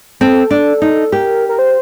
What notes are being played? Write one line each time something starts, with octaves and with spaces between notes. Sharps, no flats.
C4 A4
D4
D#4
G4 A#4
A#4
C5